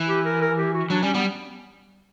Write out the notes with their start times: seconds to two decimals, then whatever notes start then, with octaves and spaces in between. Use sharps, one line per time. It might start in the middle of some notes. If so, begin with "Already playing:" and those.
Already playing: E3
0.09 G4
0.25 A#4
0.42 A#4
0.58 G4
0.74 F#4
0.90 F#3 D4
1.03 G3 C#4
1.14 G3 B3